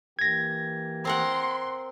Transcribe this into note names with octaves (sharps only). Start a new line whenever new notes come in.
E3 A#3 G4 G#6 A#6
C4 A#4 F#5 C6